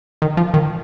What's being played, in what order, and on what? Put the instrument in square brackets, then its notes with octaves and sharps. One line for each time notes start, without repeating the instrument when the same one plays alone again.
[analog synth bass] D#3
F3
D#3